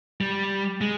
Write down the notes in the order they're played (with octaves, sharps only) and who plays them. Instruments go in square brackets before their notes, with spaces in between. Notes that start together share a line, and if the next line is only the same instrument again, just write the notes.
[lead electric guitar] G3
G#3